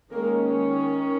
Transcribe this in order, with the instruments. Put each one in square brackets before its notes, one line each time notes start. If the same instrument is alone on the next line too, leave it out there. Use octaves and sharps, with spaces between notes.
[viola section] D#3 G#3 A#3 C#4 A#4